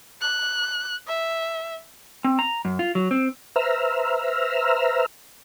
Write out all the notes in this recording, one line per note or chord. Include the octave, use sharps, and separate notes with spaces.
F#6
E5
C4
A#5
F#2
F4
F#3
C4
B4 C5 E5 A#5 E6 F6